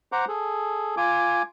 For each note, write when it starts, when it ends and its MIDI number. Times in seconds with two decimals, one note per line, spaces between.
0.12 0.25 72
0.12 0.25 78
0.12 0.25 82
0.12 0.25 86
0.28 0.95 68
0.28 0.95 69
0.97 1.42 65
0.97 1.42 80
0.97 1.42 86